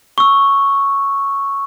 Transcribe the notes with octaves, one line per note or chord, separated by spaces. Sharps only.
C#6 E6